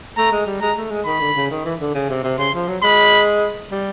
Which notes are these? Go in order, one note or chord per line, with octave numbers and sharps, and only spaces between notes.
A3 A#5
G#3
G3
G#3 A#5
A3
G#3
D#3 B5
D3
C#3
D#3
E3
D3
C#3
C3
C3
C#3 C6
F3
F#3
G#3 B5
G3